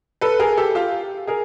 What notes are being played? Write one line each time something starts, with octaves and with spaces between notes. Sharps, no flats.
A4 B4
G#4 A#4
G4 A4
F4 G4
G#4 A#4